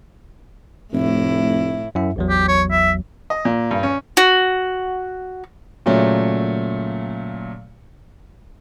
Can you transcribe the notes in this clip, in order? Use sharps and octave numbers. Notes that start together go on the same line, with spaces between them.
F1 A2 E4
F#2 E4 E5
A1 E2 F#3
G4
C#5
E5
D#5
A#2
G2
C#4
F#4
A#2 C#3 F#3 A3